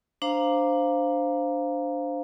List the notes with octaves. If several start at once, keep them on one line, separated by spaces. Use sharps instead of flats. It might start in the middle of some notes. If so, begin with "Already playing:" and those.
D4 C5 F5 A#5